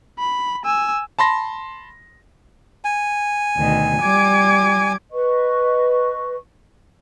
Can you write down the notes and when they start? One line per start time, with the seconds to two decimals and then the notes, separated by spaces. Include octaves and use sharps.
0.19 B5
0.65 G#5 E6
1.19 A5 B5 C6 A#6
2.85 G#5
3.57 D2 B2 D#3
4.02 G3 D6 G#6
5.12 B4 D#5 C#6